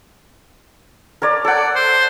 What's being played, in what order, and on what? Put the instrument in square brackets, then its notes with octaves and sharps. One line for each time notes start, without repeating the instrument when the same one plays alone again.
[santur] A#4 C#5 D5
[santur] A4 F#5 [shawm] D5
[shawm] C5